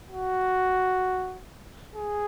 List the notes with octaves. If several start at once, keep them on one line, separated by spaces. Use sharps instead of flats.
F#4
G#4